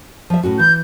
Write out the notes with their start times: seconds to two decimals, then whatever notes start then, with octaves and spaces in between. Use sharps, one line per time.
0.30 F3 E5
0.43 A2 C#4 F#4
0.59 E3 G6